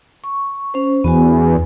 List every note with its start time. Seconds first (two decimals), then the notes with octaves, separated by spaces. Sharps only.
0.24 C#6
0.74 C#4 C5
1.04 E2 B3 F#4 G#5